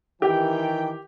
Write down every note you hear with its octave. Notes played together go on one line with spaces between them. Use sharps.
D#3 E3 G4 G5